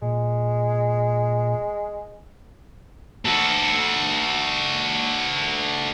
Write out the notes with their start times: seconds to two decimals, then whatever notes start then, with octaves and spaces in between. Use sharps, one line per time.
0.02 A#2 G#3
3.25 F#4 A4